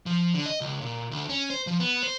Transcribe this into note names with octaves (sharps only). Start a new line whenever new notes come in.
F3
D3
D#5
C#2
A#2
D2
C#4
C5
F3
B3
C5